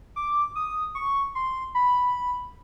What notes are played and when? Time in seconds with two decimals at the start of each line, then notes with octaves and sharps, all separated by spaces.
0.16 D6
0.56 D#6
0.95 C#6
1.35 C6
1.75 B5